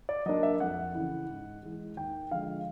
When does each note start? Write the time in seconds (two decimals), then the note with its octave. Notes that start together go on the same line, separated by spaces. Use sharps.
0.09 D5
0.26 F#3 A#3 D4 D#5
0.43 E5
0.60 F2 F#5
0.95 C#3 E3
1.29 G#2
1.63 E3 G#3
1.97 D#2 G5
2.31 D3 F3 G#3 F5